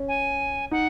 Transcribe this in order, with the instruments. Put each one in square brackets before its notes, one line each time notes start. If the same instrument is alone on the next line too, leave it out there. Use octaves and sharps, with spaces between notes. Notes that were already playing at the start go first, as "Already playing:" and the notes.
Already playing: [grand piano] C#4
[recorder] G#5
[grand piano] D#4 [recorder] F#5